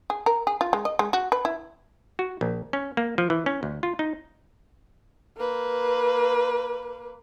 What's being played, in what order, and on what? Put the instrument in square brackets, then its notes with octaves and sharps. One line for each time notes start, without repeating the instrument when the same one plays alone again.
[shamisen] G#4
A#4
G#4
F4
G#3
D#5
G#3
F#4
B4
E4
[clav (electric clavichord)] F#4
A#1
C#4
A#3
F3
E3
C#4
D2
F4
D#4
[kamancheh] A#3 B4